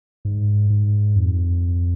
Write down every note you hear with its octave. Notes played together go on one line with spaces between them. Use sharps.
G#2
G#2
F2